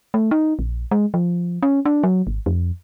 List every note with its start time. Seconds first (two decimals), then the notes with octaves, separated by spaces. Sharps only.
0.14 A3
0.31 D#4
0.59 A#1
0.91 G#3
1.14 F3
1.63 C#4
1.86 D4
2.04 F#3
2.27 G#1
2.46 F2